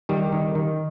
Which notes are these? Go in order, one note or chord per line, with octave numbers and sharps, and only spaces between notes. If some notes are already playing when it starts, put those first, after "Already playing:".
D#3 G3
D#3
D#3